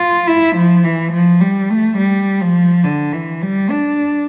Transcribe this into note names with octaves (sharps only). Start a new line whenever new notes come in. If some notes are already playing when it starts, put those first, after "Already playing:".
Already playing: F4
E4
F3
E3
F3
G3
A3
G3
F3
D3
E3
G3
D4